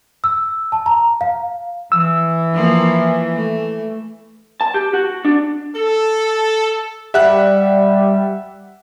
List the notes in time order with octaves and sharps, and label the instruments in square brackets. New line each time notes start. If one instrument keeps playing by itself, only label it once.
[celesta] E6
A5
A#5
F5
[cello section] E3 [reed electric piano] E6
[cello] F3 A#3
A3
[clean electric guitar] A5
G4
F#4
D4
[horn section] A4
[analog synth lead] G3 [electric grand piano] E5 F#5 F#6